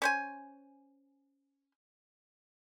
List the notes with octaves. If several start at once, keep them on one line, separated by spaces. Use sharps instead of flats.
C#4 C5 G#5